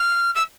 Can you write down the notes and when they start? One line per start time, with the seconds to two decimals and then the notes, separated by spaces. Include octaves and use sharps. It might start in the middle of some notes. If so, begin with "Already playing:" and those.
Already playing: F6
0.35 E6